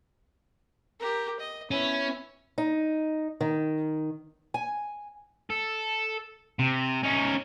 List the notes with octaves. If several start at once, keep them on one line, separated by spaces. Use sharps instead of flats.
G4 A#4
D#5
B3 C#4 E4
D#4
D#3
G#5
A4
C3
C#4 D#4